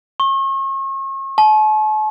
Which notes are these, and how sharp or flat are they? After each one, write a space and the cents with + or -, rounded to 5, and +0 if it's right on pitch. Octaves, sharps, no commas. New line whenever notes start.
C#6 -40
A5 -45